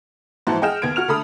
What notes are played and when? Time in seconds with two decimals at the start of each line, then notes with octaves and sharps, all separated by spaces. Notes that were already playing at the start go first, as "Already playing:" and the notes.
0.47 G#2 E3 F3 F#4 C5 A5
0.62 G#4 D#5 F#5 G5 F6 E7
0.82 D#2 B3 G#6 D7
0.96 F#4 F6 F7
1.08 D3 A3 A4 B5 D#6